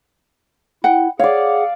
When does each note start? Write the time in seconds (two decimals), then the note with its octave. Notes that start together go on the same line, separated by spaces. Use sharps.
0.84 E4 F#5 G5
1.19 G#4 C#5 D5 F5 F#5